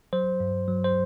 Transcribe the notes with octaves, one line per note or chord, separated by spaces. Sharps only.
F#3 C5
G2
F#3
C5